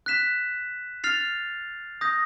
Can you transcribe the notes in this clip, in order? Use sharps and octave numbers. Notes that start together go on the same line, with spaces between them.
F#6 B6 E7
F6 A6 C7 F7
D#6 G6 A#6